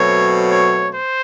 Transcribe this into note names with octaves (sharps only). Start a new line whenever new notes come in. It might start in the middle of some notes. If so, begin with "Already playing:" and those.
Already playing: B2 F#3 A3 C4 C#5
C#5
C5